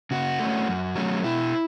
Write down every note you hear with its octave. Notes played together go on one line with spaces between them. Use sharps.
C#3 F#4
A3 C#4
F#2
F#3 A3 C#4
B2 E4